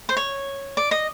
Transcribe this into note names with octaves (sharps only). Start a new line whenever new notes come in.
C5
C#5
D5
D#5